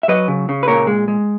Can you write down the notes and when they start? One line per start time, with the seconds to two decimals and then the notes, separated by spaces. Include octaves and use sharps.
0.03 E5
0.08 F#3 B4 D#5
0.28 C#3
0.49 C#3
0.63 B4
0.68 A#2 A#4 C#5
0.87 G#3
1.08 G#3